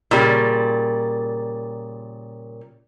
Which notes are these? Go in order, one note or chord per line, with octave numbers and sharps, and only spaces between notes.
A#2 C#3 G3